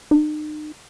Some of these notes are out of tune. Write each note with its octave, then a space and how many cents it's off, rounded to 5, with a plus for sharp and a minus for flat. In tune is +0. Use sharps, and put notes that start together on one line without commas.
D#4 -40